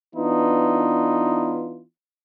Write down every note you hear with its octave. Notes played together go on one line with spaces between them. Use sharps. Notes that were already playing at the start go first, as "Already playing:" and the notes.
E3 B3 D4 D#4 F4